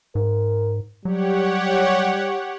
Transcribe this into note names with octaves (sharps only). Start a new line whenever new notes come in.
G#2 A#4
F#3 G3 G4 C#5 F#5